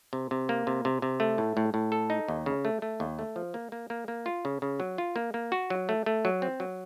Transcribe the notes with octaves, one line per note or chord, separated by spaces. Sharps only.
C3
C3
A#3
C3
C3
C3
A3
A2
A2
A2
A4
D#4
D#2
C#3
A3
A3
D#2
A3
F3
A#3
A#3
A#3
A#3
F4
C#3
C#3
F#3
F4
A#3
A#3
F#4
F#3
A3
A3
F#3
C4
F#3